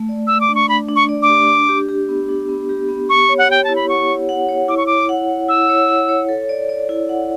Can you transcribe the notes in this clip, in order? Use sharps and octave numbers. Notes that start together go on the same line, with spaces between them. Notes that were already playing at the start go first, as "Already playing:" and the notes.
Already playing: A3
D5
D5 E6
D6
D4
C#6
D4 B5
D4
C#6
D5
D6
G4
D4
G4
G4
B3
D4
B3
G4
B3
G4 C#6
C#5
F#5
G4 G5
E4 A5
B5
F#5 C#6
C#5
F#5
C#5
E4 D6
C#6
C#5 D6
F#5
C#5
E4 E6
C#5
F#5
C#5
A4
D5
D5
E4
F#5